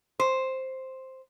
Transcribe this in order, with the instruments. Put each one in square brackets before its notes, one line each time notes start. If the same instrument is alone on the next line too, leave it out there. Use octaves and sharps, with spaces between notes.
[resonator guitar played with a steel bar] C5